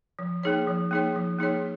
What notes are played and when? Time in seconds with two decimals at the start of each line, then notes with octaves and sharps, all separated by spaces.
0.19 F3
0.43 A#3 D#4 G#4 C#5
0.68 F3
0.91 A#3 D#4 G#4 C#5
1.16 F3
1.39 A#3 D#4 G#4 C#5